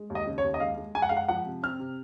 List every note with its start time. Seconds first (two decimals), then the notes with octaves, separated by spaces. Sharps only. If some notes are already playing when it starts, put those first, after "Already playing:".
Already playing: G#3
0.10 D#2
0.15 D#5
0.27 C#3
0.38 C#5
0.44 D#2
0.54 D#5
0.60 G#3 F5
0.78 G#3
0.95 G#3 G#5
1.02 F#5
1.09 G#3 F5
1.17 F#5
1.28 F3 F#5
1.46 C3
1.63 C4 F6
1.79 C3